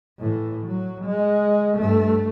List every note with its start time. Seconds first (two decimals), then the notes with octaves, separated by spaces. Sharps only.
0.19 A2 E3
0.65 F#3
1.05 G#3
1.76 G2 A3